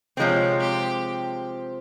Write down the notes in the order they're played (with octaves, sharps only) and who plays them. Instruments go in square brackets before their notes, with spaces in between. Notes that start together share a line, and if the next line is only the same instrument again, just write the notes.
[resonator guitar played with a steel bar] C3 F3 G#3 C4 [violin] C#5
[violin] G4